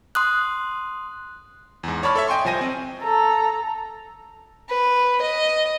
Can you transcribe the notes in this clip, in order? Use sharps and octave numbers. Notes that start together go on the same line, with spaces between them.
C6 D#6 F#6
E2 G#2
C#5 D5 A5 B5 C#6 F6
A4 C#5 E5
D#5 G5 G#5 C6 C#6
C2 F3 C5 G#5 A#6 D#7
C4
A4 A#5
B4
D#5